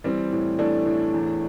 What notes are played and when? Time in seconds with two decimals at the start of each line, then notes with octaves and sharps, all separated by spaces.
0.04 E3 G3 C4
0.32 A2
0.58 E3 A3 D4
0.86 A2
1.14 E2